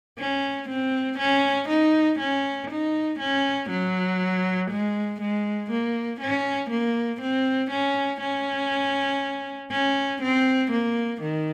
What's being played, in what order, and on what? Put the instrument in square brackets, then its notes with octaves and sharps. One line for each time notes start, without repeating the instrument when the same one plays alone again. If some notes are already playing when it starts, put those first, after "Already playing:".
[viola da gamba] C#4
C4
C#4
D#4
C#4
D#4
C#4
F#3
G#3
G#3
A#3
C#4
A#3
C4
C#4
C#4
C#4
C4
A#3
D#3